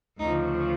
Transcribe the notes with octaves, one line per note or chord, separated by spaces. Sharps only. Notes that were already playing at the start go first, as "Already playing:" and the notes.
D2 C#3 F3 D#4